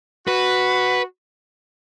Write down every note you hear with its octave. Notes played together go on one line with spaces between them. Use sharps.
F#4 B4